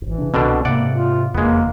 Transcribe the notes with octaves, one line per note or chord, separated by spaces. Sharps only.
D#1 G#1 E3
C#3 D4
C2 B2 D3 C4 D4
G#2 C3 A#3 D5 F#5
F4
F1 E2 D3 G#3 A#3 B3